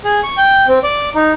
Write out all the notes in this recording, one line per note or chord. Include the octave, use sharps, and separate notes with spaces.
G#4
C#6
G5
C4
D5
D#4